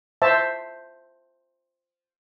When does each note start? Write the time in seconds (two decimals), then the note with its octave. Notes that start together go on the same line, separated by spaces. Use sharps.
0.22 C5 E5 A5